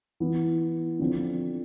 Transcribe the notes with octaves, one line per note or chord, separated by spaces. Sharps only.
E3 B3 E4
D3 F3 C4